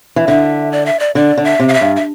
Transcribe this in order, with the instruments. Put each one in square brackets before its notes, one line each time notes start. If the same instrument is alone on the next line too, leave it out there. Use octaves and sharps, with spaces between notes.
[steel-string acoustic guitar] E3
[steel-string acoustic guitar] D3 [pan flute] E5
[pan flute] D5
E5
D5
[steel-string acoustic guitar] D3 [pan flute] D5
[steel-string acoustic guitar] D3
[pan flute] E5
[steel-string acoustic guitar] C3
[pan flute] F5
E5
[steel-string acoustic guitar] G2
[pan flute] E5